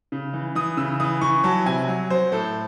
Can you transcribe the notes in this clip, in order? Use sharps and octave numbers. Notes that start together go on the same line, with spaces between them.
C#3
E3
E3 D#6
C#3 E6
E3 D#6
E3 C#6
F#3 A5
C3 G#5
F#3
F#3 C5
A2 A4